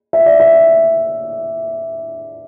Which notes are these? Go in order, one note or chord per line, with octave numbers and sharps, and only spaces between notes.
E5
D5
E5